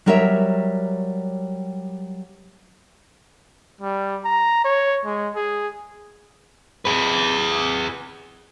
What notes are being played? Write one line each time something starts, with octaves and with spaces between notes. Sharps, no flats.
F#3 G3 A#4 C#5 D#5 E5
G3
A#5
C#5
G#3
G#4
G#4 B4